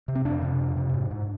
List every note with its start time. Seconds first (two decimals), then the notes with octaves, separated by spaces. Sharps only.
0.08 C3
0.15 C4
0.25 F2 D4
0.42 C3
0.60 F2
0.76 C3
0.94 G#2
1.11 G#2